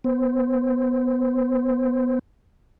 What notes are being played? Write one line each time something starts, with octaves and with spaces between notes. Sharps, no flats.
B3 C5